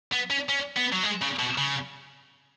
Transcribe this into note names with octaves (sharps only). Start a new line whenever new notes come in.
B3
C#4
C#4
B3
F#3
G#3
C#3
B2
C#3